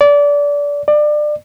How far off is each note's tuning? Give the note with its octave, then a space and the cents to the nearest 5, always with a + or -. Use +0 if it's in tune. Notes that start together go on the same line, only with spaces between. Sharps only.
D5 -25
D5 +25